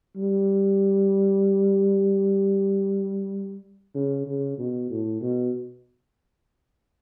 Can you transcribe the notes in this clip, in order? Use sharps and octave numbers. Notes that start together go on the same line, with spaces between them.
G3
C#3
C#3
B2
A2
B2